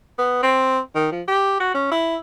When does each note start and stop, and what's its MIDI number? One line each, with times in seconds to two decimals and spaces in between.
0.18 0.40 59
0.43 0.79 60
0.95 1.10 51
1.12 1.22 53
1.28 1.59 67
1.60 1.74 66
1.75 1.87 61
1.92 2.17 64